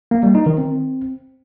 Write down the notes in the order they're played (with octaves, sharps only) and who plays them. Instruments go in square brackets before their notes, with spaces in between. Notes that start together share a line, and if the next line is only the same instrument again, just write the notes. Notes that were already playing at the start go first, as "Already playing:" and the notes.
[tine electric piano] A#3
G3
D#4
D#3
C4